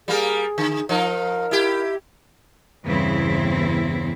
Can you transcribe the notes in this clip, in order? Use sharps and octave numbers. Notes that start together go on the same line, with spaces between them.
G3 A#3 G#4 A#4
D3
F3 D#4 A#4
E4 G4
E2 G2 C#3 C4 E4